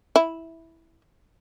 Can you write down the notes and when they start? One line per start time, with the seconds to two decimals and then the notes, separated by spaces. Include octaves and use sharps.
0.16 E4